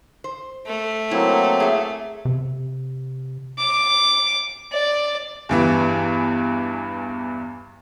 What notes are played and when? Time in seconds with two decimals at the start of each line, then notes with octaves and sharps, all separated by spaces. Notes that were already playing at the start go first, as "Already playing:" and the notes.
0.24 C5
0.66 A3
1.11 F#3 A#3 C4 E4
1.60 G#4 E5
2.25 C3
3.58 D6
4.72 D5
5.49 E2 G2 E3